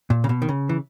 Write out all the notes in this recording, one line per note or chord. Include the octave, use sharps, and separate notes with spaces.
A#2
C#3
B2
D#3
C#3
E3